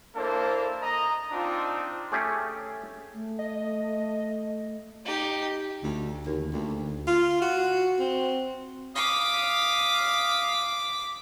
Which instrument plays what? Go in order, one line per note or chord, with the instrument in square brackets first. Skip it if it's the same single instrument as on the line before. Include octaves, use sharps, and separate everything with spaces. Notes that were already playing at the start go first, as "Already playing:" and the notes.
[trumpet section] A#3 D4 E4 A4 C5
D#5 A#5
C4 D4 D#4 F4
[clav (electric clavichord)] A3 C#4 G4 G#4
[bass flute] A3
[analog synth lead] D#5
[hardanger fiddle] D#4 G4
[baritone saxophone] D2
D#2
D2
F4
F#4
C4
[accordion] F5 D#6 [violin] D6 B6